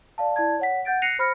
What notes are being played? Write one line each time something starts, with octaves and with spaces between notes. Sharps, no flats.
D5 F5 A5
E4 D5 A5 G#6
C#5 F#5 B6
F#5 G6 A6 D7
F#6 A#6 C7 C#7 D#7 F7
C5 B5 F6 A#6 C#7